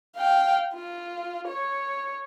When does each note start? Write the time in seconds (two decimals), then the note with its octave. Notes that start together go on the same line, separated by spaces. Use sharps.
0.16 F5 G5
0.74 F4
1.48 C#5